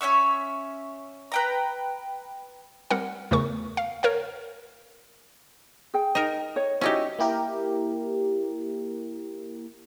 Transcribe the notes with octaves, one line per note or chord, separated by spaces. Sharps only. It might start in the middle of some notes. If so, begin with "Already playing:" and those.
C#4 C#5 E5 C#6
B4 G5 A#5
G3 C4 A#4 F#5
E2 C#3 A3 A#4 C#6
F5
A#4 C#5 F5
G#4 G5
D#4 A#4
C#5
C#4 D#4 E4 F#4 G4 D#5
A#3 E4 G4 A#4